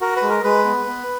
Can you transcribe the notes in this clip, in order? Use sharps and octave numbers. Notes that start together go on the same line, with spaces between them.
F#4 A#4
B4
G#3
A#4
G#3 B4
B3
B3